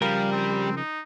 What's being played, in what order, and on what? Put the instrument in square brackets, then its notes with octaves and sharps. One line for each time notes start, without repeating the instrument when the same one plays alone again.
[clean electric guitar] C#3 F3 A#4 [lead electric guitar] G3 [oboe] F5
[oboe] C4
D#4